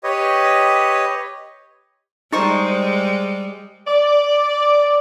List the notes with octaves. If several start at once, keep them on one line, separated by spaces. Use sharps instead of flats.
G4 B4 C#5 D#5
G3 G#3 D#4 A#4 C5 D#5 C#6
D5